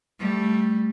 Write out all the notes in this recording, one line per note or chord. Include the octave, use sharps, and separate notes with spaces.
G3 A3